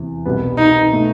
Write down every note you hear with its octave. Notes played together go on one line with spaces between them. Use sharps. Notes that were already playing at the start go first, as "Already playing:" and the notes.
Already playing: E2 C3 E3
C2 B2 G3 B3
D#4
B2 A3 D#4